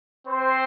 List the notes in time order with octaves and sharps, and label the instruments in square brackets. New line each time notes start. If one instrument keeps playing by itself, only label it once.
[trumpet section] C4 C5